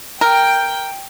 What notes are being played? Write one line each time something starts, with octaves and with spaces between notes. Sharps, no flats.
A#4 G5